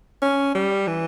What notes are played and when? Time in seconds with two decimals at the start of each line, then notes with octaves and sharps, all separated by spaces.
0.22 C#4
0.55 G3
0.87 E3